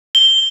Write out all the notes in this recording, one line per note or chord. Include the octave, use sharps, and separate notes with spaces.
G7